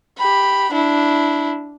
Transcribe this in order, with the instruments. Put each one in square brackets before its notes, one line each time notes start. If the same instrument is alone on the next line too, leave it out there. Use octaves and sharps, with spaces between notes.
[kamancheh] G4 B5
D4 E4